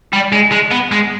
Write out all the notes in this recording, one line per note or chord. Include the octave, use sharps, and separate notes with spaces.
G3
G#3
G#3
B3
G#3